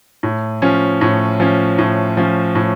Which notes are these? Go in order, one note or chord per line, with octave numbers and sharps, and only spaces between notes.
A2
F3 C#4
A2
F3 C#4
A2
F3 C#4
A2